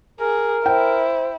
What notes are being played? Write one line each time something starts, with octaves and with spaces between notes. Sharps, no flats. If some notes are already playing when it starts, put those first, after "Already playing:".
G#4 A#4
E4 C5 G5